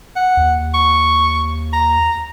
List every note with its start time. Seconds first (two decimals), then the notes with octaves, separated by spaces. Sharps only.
0.16 F#5
0.37 D#2
0.74 C#6
1.73 A#5